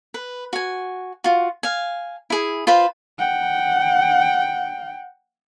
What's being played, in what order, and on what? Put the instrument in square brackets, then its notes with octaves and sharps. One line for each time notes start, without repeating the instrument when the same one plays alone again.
[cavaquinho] B4
F#4 G#5
F4 F#4
F5 G#5
E4 G#4
F4 B4 C5 B5
[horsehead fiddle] F#5 G5